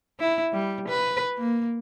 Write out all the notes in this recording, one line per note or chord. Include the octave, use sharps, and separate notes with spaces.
E4
G3
B4
A#3